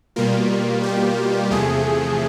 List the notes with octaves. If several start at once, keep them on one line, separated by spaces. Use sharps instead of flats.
B2 G3 A#3 F4
G4
E2 C3 F3 A3 G#4